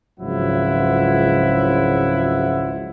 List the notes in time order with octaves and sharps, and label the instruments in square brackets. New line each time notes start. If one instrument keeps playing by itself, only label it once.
[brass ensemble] G#1 C#2 F3 F#3 E4 F#5